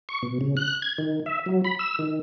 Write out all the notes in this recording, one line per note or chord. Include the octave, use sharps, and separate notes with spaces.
C#6
B2
C#3
F#6
G#6
D#3
E5
F#3
B5
E6
D#3